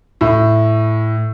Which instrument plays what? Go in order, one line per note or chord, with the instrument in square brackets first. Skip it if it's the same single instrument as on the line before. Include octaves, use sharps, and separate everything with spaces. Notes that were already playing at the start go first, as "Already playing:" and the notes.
[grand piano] A2